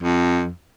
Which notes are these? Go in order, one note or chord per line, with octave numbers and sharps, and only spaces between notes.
F2